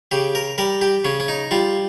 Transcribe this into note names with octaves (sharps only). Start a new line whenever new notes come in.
C#3 G4
A#4
G3 A#4
G4
C#3 C#4
C#4
D#4
G3 F4